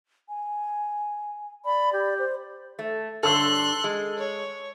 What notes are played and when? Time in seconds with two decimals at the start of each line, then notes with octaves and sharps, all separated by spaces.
0.29 G#5
1.65 D5 B5
1.93 G4
2.19 C5
2.79 A3
3.23 G2 D3 A4 C#5 C6 E6 F#6
3.84 G#3
4.17 C#5